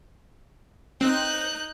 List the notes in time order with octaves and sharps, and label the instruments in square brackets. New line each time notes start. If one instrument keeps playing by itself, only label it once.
[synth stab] C4 [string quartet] D#4 F#6 G6